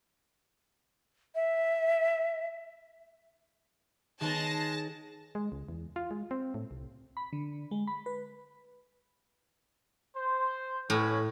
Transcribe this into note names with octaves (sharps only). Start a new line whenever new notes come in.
E5
D#3 G#3 B3 C#5 A5 A#6
G#3
C#2
E2
F4
G#3
C4
A2
C2
B5
D3
G#3
B5
B4
C5
A2 C#4 B4 C#5